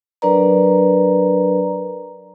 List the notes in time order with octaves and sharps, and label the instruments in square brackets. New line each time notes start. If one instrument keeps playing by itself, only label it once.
[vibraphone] F#3 D4 A#4 B4 D5 A#5